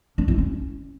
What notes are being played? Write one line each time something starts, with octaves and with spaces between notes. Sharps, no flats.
D4
E4
C#4